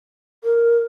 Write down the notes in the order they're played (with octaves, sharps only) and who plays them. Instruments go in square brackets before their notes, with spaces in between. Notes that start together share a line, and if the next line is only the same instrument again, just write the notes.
[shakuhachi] A#4